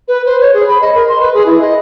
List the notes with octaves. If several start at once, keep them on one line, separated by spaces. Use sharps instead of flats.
B4
C5
C#5
G#4
B5
D#5
A#4
C6
B4
G#4
E4
D#5